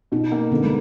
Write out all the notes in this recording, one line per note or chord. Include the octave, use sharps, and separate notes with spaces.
B2 D#4
A#3
D3 B3
G#3